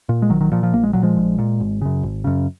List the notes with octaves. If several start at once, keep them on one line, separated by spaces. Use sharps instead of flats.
A#2
G#3
A#1 D#3 F#3
D#3 F#3
A#2 F3
F3
A#1 A#3
G#3
A#2 F#3
F3 G#3
A#1
A#2
G#1
F#2 C#3
G#1
F#2 C#3